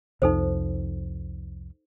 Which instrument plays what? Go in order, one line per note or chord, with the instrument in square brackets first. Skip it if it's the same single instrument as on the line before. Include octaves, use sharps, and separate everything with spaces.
[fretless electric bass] C2 F2 [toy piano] D#4 A4 C5